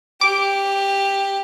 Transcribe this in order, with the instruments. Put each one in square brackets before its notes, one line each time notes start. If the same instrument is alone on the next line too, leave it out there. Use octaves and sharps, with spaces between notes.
[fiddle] G4 [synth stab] D6